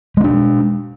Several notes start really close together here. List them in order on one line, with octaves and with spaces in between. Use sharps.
G#3 C#4 D4